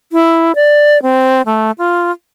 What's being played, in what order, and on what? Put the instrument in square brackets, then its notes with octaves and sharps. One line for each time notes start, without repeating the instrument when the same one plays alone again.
[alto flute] E4
D5
C4
A3
F4